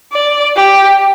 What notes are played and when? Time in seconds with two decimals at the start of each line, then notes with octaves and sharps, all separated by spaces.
0.12 D5
0.56 G4